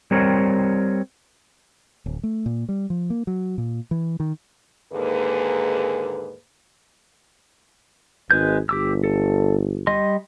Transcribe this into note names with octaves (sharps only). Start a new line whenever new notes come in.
G3 C4 A#4 C#5
D1
A3
A#2
G3
F3
A#3
F#3
A#2
E3
D#3
D#2 G#2 D3 A#3 G#4 B4
G#1 G#3 B4 G6
G1 G4 D6 E6
A4
G3 D#5 C6